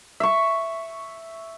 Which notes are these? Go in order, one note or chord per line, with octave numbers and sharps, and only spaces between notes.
E5 C#6